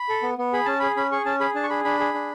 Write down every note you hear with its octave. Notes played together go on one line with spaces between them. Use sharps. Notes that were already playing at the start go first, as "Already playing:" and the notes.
Already playing: B5
A4
B3
B3
G#4 B5
C#4 A5
G#4 B5
C#4 B5
G#4 C#6
C#4 A5
G#4 B5
D4 A5
C#6
G#4 B5
D4 B5
G#4
D4